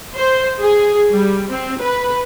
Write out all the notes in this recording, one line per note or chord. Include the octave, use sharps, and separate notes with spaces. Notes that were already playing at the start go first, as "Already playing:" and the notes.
C5
G#4
G3
C4
B4